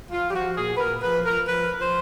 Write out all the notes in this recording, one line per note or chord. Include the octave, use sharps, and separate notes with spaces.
F3 F4
G4
F3 F#4
A#2 G#4
B4
A#2 A#4
F3 B4
F3 A#4
F3 B4
F3
C5